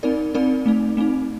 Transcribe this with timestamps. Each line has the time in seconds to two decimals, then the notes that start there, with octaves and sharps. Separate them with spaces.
0.03 C4 D#4 A#4 D5
0.34 C4 D#4 A#4 D5
0.66 A3 C4 D#4
0.97 A3 C4 D#4